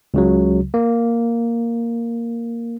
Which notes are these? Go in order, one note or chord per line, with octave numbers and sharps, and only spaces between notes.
C#2 C#3 F#3
A#3